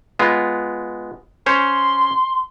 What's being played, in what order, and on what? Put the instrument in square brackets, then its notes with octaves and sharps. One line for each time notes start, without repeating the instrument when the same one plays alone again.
[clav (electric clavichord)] G#3 B3 F4
[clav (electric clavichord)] C#4 C5 C#5 [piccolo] C6